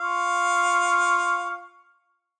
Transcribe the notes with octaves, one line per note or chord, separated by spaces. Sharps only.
F4 F5 C#6